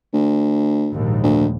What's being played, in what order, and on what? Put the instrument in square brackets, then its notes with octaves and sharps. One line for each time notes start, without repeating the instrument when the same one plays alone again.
[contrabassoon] D2
[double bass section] A#1 D#2 G#2
[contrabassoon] D2